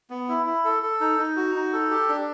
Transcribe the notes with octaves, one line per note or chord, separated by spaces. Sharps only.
B3
E4
E4
A4
A4
D#4
D#4
F#4
D#4
A4
G4
D4